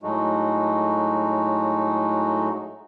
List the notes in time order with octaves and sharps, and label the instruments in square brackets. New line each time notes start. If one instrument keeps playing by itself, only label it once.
[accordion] A2 F#3 G#3 A3 D#4 F#4